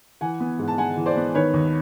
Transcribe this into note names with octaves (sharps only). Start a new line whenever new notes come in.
E3 F#5 G#5
B3
G#2
A5
G#3 F#5 G#5
E3
C5 D5
B3
D#3 B4 C#5
D#2